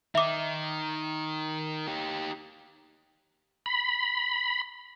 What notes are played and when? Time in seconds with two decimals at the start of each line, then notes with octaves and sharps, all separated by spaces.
0.15 D#3 D#4 E5 D6
1.87 D#4 G4
3.66 B5